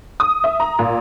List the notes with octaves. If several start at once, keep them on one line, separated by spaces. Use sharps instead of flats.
D#6
E5
A#5
A#2